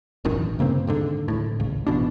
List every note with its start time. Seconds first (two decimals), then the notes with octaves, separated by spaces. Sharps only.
0.25 E1 A1 F#2 D#3
0.59 G2 C#3 A#3 C4
0.87 D#2 G#2 D3
1.28 D1 A2
1.60 G#1 C#2
1.87 A1 B2 D4